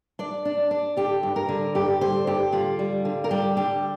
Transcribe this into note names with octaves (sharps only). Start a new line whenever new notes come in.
D4 D5
D4
D4
D3 G4
G2
A#4
D3
G2 G4
D3 C5
G2 G4
D3 F4
G3
D3
A#4
G3 G4
D3 G4